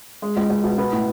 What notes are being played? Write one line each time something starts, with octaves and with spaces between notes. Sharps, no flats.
G#3
C#2
C#2
B2
B3
A2